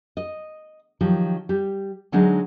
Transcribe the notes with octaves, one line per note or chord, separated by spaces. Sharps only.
D#5
D#3 F3 F#3 G4
G3 G4
D3 F#3 G#3 D4 D#4 G#4